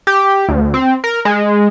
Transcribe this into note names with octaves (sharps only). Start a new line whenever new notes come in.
G4
D2
C4
A#4
G#3